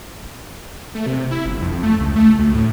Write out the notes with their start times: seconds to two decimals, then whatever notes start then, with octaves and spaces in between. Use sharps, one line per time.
0.95 A3
1.06 C3
1.31 E4
1.46 G1
1.61 F2
1.83 A3
2.00 C#2
2.16 A3
2.39 D2
2.54 A2